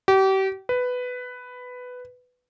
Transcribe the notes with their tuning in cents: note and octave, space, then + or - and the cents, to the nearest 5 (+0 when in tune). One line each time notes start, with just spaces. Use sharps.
G4 -35
B4 +10